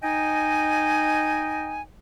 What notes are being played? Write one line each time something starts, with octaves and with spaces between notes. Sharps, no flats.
D#4 D#5 G5 G#5